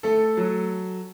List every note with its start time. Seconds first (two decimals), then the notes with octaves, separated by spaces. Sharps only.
0.03 A3 A4
0.37 F#3